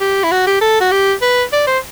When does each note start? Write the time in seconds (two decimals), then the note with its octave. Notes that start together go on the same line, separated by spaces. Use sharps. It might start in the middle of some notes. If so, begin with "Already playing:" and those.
0.01 G4
0.23 E4
0.31 F#4
0.47 G4
0.61 A4
0.80 F#4
0.91 G4
1.22 B4
1.53 D5
1.67 C5